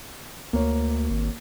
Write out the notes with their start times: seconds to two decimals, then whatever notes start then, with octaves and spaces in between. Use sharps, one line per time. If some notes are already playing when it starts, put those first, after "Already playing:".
0.53 D2 A#3 C#5
1.10 G#1